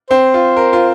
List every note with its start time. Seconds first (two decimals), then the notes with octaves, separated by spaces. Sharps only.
0.10 C4 C5
0.34 F4
0.57 A#4
0.73 F4